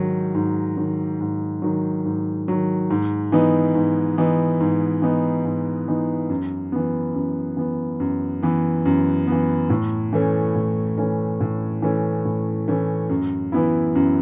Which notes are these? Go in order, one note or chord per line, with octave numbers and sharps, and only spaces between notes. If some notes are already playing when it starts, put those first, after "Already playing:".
Already playing: G#2 D#3 F#3
G#2
D#3 F#3
G#2
D#3 F#3
G#2
D#3 F#3
G#2
E3 B3 D#4
G#2
E3 B3 D#4
G#2
E3 B3 D#4
G#2
E3 B3 D#4
F#2
E3 B3
F#2
E3 B3
F#2
E3 B3
F#2
E3 B3
A2
E3 A3 C#4
A2
E3 A3 C#4
A2
E3 A3 C#4
A2
E3 A3 C#4
F#2
E3 B3 E4
F#2